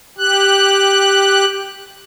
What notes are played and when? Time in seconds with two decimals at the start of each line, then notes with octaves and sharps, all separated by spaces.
0.18 G4 F#6